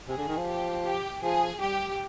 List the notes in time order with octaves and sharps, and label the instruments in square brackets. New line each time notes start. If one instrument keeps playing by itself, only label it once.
[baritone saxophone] C3 [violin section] G#4
[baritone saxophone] D3
D#3
F3
[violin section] G4
G4
[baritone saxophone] F3 [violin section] G#4
[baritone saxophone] G3 [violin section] G4